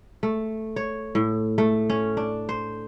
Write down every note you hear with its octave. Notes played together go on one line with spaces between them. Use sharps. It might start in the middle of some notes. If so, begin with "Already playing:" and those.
A3
C#5
A2
A3
C#4
D4
C5